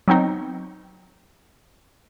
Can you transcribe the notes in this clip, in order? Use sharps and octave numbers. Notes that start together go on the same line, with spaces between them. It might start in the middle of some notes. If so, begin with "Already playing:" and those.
F#3 B3 C4 D#4